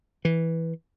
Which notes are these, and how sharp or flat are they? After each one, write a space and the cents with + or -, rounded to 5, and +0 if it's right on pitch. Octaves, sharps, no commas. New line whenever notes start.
E3 -5